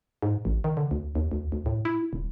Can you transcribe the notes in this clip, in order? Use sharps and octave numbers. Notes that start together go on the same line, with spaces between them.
G#2
A1
D#3
D3
D2
D#2
D2
D2
A2
E4
D#1